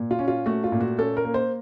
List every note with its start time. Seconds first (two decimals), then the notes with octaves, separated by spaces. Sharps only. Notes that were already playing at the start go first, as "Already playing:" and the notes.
Already playing: A#2
0.11 F4
0.19 C#4
0.28 F4
0.46 A3 F#4
0.64 F4
0.72 A#2
0.81 F#4
0.99 C#4 A4
1.17 A#4
1.25 A#3
1.34 C5